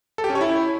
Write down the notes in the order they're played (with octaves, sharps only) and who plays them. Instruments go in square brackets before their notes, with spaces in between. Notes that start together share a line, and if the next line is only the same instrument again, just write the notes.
[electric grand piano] A4
G4
C#4
C#5
E4